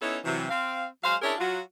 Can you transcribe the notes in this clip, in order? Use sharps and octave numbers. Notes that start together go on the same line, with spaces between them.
B3 C#4 D#4 E4 A4 C#5
C3 E3 F#3
C4 F5
F#3 G#3 C5 F5
C#4 D4 E4 G#4 A#4 C#5
F#3 F4 F#4